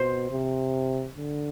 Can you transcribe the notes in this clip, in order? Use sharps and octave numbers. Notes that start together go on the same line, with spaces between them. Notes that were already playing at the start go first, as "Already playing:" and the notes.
Already playing: B2 C5
C3
D3